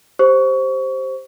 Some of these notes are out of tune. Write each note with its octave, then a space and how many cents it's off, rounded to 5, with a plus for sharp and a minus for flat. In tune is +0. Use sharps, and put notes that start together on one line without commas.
G4 +0 C5 +5 C#6 +25